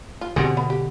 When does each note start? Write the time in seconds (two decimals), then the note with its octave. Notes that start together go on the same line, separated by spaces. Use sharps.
0.21 F4
0.36 B2 D3 C4 G4 G#4
0.57 B3
0.70 G4